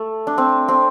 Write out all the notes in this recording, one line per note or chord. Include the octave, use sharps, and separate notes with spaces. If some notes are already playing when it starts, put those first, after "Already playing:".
Already playing: A3
D4
C4
C4